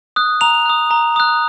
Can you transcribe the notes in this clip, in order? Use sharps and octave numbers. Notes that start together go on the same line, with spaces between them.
D#6 F#6
A#5 F7
D#6 F#6
A#5
D#6 F#6